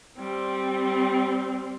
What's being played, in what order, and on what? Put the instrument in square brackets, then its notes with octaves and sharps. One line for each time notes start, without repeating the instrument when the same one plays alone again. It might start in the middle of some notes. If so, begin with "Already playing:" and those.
[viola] G3 C4